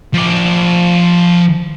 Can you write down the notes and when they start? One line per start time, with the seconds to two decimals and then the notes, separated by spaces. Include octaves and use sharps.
0.14 F3 D5